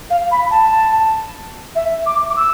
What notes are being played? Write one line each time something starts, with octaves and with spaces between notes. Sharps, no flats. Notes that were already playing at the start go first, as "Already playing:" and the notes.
F5
B5
A5
E5
D6
D6
E6